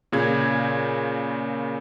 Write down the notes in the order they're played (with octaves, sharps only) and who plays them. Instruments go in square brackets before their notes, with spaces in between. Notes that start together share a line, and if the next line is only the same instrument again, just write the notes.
[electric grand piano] A#2 C#3 G#6